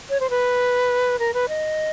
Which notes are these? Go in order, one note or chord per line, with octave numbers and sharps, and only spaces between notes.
C#5
C5
B4
A#4
B4
D#5